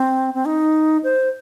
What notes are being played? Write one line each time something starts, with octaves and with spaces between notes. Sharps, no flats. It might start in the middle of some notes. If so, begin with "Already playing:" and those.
Already playing: C4
C4
D#4
C5